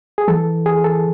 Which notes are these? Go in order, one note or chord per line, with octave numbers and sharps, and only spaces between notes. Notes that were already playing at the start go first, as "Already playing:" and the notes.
G#4
E3 A4
G#4
A4